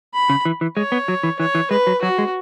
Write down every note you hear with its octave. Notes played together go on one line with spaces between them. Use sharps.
B5
C#3
E3
E3
G#3 C#5
B3
F#3
E3
E3 C#5
E3
G#3 B4
F#3
F#3 F#4
G#3